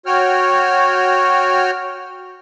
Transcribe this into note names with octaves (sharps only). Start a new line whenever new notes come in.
F#4 C#5 G5 F6